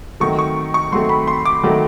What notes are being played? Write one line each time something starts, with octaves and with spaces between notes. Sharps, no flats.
D#3 F#3 A3 C4 C#6
C#6
C#6
D#3 F#3 A3 C4 C6
B5
C6
D6
D#3 F#3 A3 C4